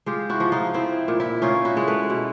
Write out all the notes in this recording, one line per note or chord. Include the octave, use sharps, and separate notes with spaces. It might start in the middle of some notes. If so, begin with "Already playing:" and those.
G#3 F4 G4
E4 F#4
F3
D#4 F4
C4 E4
A#2
E4
C#4 D#4 F4
E4 F#4
G#3
A4 B4
B2